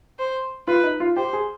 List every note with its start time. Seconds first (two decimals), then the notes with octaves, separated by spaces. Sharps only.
0.19 C5
0.68 F4 B4
0.84 D#4
1.00 F4
1.16 G4 C5
1.33 G#4